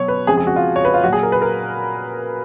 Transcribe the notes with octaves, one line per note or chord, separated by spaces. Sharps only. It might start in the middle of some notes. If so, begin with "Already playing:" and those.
Already playing: B2 F#3 C#5
B4
F2 C#3 F3 G#3 G#4
G#4
F#4
F4
C#5
B4
F4
A#2 F#3 F#4 G#4
A#4
B4
A#4